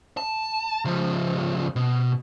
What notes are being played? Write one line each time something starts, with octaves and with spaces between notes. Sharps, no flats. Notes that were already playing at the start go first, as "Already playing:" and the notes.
A5
C#2 F3
B2